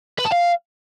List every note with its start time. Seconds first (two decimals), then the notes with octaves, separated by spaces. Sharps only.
0.19 B4
0.26 A5
0.32 F5